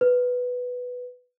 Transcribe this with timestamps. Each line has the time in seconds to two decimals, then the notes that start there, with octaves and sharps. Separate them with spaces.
0.01 B4